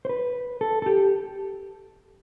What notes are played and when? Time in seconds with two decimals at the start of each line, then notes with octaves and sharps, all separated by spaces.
0.05 C5
0.09 B4
0.61 A4
0.82 A4
0.86 G4